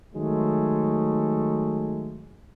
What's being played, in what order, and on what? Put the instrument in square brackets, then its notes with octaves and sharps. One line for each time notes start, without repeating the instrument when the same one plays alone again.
[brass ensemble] D#3 F#3 G#3 A3